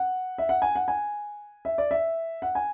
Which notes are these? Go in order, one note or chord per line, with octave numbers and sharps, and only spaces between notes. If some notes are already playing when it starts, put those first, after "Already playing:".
Already playing: F#5
E5
F#5
G#5
F#5
G#5
E5
D5
E5
F#5
G#5